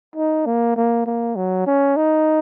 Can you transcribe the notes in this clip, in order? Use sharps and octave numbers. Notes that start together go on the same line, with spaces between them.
D#4
A#3
A#3
A#3
F#3
C#4
D#4